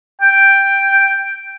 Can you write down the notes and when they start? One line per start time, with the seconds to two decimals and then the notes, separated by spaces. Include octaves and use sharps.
0.21 G5